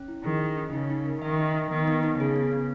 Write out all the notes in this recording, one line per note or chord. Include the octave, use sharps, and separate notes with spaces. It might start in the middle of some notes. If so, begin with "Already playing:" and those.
Already playing: C#4
E4
D#3 G#4
D#5
C#4
C#3 D#4
D#4
A#4
D#3 E5
D#4
D#4
D#3 B3
B3
D#4
C#3 G#4
B3
B3